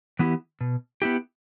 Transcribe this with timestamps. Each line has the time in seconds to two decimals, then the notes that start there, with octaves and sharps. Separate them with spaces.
0.19 E3 B3 E4 G4
0.61 B2
1.02 B3 E4 G4